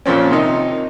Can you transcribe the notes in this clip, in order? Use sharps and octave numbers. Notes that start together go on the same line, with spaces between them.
F2 A#2 F3 C4 C#4
C3 D#3 D#4